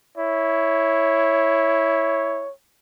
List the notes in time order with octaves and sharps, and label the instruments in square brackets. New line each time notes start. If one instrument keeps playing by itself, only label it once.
[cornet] E4 [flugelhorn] C#5